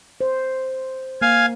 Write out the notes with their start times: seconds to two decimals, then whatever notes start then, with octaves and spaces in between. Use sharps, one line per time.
0.21 C5
1.22 A#3 F5 G#5